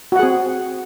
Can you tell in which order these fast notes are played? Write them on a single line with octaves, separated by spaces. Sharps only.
F#4 F#5 G#4 C4